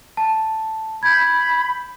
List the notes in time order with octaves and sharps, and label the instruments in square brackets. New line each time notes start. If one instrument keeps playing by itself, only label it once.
[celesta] A5
[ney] B5 [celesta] G6 G#6